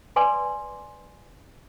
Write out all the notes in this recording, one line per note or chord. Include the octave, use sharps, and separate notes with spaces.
B4 D5 G#5 C6 D6